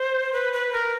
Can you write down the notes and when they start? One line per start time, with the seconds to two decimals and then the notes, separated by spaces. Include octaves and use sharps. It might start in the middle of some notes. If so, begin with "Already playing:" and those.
Already playing: C5
0.33 B4
0.53 B4
0.73 A#4